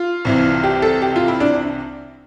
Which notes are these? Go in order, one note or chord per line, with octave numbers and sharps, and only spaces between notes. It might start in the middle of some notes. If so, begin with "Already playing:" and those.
Already playing: F4
C2 C3 E3
G4
A4
G4
F4
E4
D4